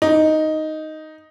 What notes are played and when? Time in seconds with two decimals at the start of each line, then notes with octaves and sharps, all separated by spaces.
0.02 D#4